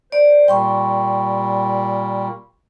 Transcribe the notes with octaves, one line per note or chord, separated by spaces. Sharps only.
C5 D5
A#2 G3 G5 C6 C#6